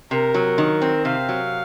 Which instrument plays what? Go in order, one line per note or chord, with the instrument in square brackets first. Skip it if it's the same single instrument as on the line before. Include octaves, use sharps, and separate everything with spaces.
[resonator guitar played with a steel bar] C3 [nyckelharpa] A#4
[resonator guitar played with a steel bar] F#3
D#3
C4
[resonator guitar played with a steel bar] C3 [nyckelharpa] F5
[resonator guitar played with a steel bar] F#3